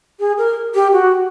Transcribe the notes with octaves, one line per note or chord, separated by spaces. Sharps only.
G#4
A#4
G4
F#4